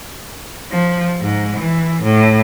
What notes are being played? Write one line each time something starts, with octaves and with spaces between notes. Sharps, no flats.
F3
G#2
E3
A2